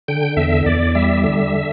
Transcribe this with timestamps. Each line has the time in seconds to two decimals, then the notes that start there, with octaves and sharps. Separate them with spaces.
0.08 D3 G5
0.37 E2 E5
0.66 E2 D5
0.95 G3 E5
1.24 D3